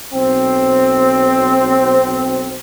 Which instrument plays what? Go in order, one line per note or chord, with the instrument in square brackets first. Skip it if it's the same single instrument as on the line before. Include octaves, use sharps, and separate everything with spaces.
[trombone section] B1 C4